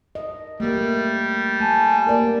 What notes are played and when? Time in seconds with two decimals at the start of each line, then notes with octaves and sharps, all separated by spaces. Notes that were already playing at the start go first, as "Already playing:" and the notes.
0.15 D#5
0.60 G3 A3 A#3
1.60 A3 G#5 A5
2.07 A#3 A#4 D5